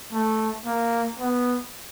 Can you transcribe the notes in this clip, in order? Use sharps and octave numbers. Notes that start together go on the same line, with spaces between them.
A3
A#3
B3